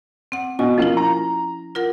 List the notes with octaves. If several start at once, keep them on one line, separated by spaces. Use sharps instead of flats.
C4 F#5
B2 G#5
F3 A#3 C#4 E4 F4
A#5
F4 A#4 F#5